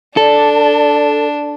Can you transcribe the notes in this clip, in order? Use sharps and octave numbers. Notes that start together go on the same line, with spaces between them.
D4 A4 D5